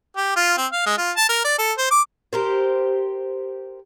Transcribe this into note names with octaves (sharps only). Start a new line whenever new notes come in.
G4
F4
C4
F5
G#3
F4
A5
A#4
D5
A4
C5
D6
G4 A#4 C5